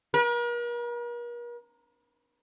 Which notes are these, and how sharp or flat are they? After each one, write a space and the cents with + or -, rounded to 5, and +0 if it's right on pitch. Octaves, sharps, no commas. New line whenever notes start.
A#4 +45